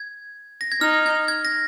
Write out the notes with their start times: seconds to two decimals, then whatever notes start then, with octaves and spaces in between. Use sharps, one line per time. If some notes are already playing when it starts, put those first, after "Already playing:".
Already playing: G#6
0.61 A#6
0.72 G#6
0.81 D#4 F6
1.06 G#6
1.28 G#6
1.45 A#6